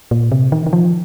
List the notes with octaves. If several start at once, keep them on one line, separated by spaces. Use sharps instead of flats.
A#2
C3
D#3
D#3
F3